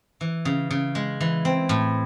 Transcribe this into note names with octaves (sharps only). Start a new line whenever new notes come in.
E3
C#3
C#3
G#3
E3
C4
A2